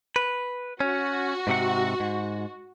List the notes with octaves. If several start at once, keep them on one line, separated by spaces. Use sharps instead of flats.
B4
C#4 F#4
G#2 C3 F#5
G#2